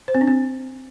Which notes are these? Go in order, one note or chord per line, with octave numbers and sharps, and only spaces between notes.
C5
C4
D4
C4